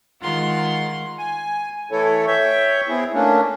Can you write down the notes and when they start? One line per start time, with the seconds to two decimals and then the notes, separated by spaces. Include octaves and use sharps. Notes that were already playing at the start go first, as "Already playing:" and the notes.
0.22 D#3 G#3 F4 F#5 C6
1.18 G#5
1.91 E3 A3 E4 A4 C#5
2.26 C#5 E5 G5
2.89 B3 C4 E4 G#4
3.14 A3 A#3 C#4 D4